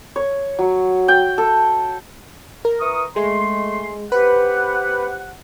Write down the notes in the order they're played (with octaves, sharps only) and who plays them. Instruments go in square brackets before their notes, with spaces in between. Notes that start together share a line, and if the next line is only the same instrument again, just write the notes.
[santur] C#5
F#3
G5
A4
[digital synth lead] A#4
[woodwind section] E3 C#6 D#6
[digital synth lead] G#3 [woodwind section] A3 C6
[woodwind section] C4 G4 F#5 [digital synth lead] B4